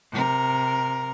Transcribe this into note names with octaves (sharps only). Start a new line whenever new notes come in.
C3 A#4